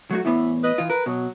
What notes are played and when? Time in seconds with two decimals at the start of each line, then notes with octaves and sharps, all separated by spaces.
0.11 F#3 A3 F#4
0.25 E2 A2 E3 B3
0.64 B4 D#5
0.78 E3 F4
0.90 A#4 B4
1.06 B2 F#3